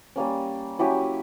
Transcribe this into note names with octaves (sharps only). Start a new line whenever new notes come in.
G3 A#3 C#4
F#3 C#4 E4 G4